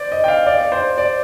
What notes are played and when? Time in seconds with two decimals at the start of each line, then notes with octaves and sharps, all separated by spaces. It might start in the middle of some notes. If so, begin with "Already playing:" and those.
Already playing: C5 D5
0.12 D#5
0.24 G5
0.28 F5
0.47 D5
0.72 C5
0.98 D5